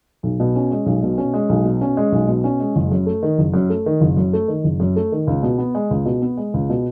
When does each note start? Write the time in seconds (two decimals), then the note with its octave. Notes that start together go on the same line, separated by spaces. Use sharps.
0.23 B1
0.40 B2
0.56 C#4
0.71 G#3
0.86 B1
1.03 B2
1.18 C#4
1.34 G#3
1.49 B1
1.65 B2
1.81 C#4
1.97 G#3
2.12 B1
2.28 B2
2.44 C#4
2.60 G#3
2.75 F#1
2.92 F#2
3.06 A3
3.23 D#3
3.38 F#1
3.54 F#2
3.70 A3
3.86 D#3
4.01 F#1
4.17 F#2
4.33 A3
4.48 D#3
4.64 F#1
4.80 F#2
4.96 A3
5.12 D#3
5.27 C#2
5.43 B2
5.58 B3
5.75 G#3
5.91 C#2
6.05 B2
6.22 B3
6.37 G#3
6.54 C#2
6.70 B2